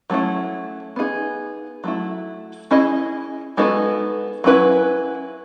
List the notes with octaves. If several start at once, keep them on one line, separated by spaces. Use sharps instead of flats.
F#3 A3 C#4 E4
B3 D#4 G#4
F#3 A3 E4
C#4 E4 G#4 D#5
G#3 B3 D#4 F#4 A4
F#3 C#4 E4 B4